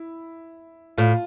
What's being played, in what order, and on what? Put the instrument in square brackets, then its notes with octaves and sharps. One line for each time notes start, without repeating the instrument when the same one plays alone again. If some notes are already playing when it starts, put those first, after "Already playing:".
Already playing: [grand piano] E4
[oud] A2 [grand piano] F4